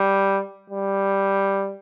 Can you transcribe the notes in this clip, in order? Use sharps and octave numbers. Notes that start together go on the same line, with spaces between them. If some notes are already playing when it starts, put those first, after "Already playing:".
Already playing: G3
G3